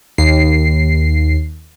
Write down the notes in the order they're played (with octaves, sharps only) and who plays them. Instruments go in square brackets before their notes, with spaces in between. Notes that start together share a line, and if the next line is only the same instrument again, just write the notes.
[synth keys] D#2 C7